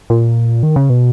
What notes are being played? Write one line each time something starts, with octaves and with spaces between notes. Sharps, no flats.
A#2
D#3
C#3
B2